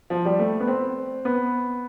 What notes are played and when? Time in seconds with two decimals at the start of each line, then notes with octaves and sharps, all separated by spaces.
0.10 F3
0.25 G3
0.39 A3
0.60 B3
0.67 C4
1.25 B3